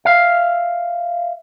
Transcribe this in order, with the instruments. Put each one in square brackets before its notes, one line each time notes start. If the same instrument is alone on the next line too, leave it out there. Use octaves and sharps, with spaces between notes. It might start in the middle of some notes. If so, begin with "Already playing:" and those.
[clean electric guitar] E5 F5